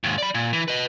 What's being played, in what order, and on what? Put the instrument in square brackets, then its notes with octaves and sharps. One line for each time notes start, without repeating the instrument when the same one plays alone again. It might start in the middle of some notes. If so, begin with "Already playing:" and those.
[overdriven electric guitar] D#2 G#2
D5 B5
A#2
E3
B4 D#5